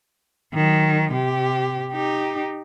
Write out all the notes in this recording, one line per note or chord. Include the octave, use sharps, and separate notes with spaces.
D#3 F#3
C3 G4
D#4 G4